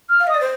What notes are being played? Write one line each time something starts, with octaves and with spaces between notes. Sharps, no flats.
F6
F5
D#5 D#6
D5
C5